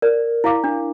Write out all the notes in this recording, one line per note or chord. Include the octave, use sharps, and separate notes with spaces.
A#4 D5
E4 F5 D6
D4